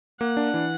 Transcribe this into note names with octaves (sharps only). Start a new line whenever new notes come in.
A#3 F#5
D4
E3